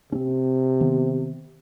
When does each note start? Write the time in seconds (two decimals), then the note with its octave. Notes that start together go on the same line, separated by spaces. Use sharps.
0.12 C3 C4 C#4
0.81 D#3 B3